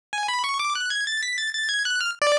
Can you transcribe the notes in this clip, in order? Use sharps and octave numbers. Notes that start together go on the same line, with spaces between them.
G#5
B5
C#6
D6
F#6
G#6
A6
B6
A6
A6
G#6
F#6
F6
D5